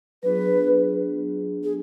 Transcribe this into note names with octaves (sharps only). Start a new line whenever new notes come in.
F#3 B3 D4 F4 G#4 B4
G#4